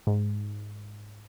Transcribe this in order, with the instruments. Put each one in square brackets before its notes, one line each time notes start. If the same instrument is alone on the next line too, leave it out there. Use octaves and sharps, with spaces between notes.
[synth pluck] G#2